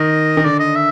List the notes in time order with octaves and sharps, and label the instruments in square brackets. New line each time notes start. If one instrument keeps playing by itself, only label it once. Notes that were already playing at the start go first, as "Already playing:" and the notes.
Already playing: [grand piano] D#3 [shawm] D#5
[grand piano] D#3
[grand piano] D3 [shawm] D5
[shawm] D#5
E5